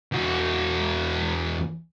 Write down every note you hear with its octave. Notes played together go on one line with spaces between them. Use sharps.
E2 F#4